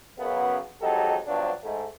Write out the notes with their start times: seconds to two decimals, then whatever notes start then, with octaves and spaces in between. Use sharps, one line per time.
0.19 F#2 C#3 B3
0.82 F2 F#3 G#3 D#4 G4 A4
1.27 G2 C3 F3 F#3 B3 D4
1.63 G#2 G#3 A3